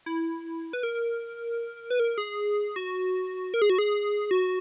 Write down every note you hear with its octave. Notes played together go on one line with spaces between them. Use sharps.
E4
B4
A#4
B4
A#4
G#4
F#4
A#4
G#4
F#4
G#4
F#4